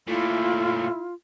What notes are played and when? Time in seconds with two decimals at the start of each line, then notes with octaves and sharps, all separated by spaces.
0.08 A#2 A3 E4 F4